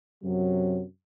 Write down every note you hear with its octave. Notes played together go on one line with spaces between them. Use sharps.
F#2 C3 F#3